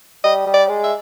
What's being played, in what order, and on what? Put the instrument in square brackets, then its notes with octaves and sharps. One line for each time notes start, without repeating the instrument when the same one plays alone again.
[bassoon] G3 [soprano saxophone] D#5
[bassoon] G3
[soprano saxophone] D5
[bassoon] G#3
[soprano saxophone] E5